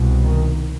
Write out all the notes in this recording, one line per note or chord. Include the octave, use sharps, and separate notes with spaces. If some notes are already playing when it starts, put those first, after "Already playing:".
Already playing: C2 B2
D#3